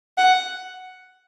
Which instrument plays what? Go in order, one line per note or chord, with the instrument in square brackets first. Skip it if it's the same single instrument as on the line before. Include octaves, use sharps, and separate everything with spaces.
[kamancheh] F#5